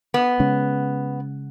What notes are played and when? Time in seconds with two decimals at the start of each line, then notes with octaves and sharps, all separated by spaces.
0.14 B3
0.40 C#3 G#3 C#4